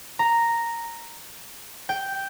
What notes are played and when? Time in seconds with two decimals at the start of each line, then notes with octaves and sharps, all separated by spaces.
0.19 A#5
1.89 G5